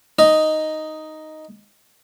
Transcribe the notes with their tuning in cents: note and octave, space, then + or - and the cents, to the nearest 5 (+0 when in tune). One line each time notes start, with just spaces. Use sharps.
D#4 +0 D#5 +0